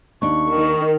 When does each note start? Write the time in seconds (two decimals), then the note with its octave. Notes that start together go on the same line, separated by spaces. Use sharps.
0.22 D#2 D4 C#6
0.55 D#3